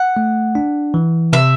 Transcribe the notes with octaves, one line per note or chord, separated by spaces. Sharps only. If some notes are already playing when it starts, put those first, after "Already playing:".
Already playing: F#5
A3
D4
E3
C3 E5